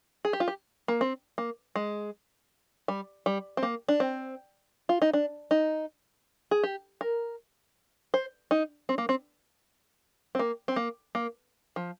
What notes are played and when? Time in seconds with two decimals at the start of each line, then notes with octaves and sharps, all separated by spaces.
0.25 G#4
0.33 G4
0.40 F4
0.48 G4
0.88 A#3
1.01 C4
1.38 A#3
1.76 G#3
2.88 G3
3.26 G3
3.57 C4
3.63 A#3
3.88 D4
4.00 C4
4.89 F4
5.02 D#4
5.13 D4
5.51 D#4
6.51 G#4
6.63 G4
7.01 A#4
8.14 C5
8.51 D#4
8.89 C4
8.98 A#3
9.09 C4
10.35 C4
10.39 A#3
10.68 C4
10.76 A#3
11.15 A#3
11.76 F3